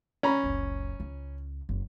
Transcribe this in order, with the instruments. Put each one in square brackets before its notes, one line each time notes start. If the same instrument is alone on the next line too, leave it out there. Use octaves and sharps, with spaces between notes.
[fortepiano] C#4 A#5 B5
[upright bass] F#1 C#2
C#2
F#1